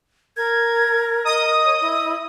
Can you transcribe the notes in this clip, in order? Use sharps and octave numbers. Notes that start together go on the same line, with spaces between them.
A#4 G#6
D#5 D#6
C#5
E4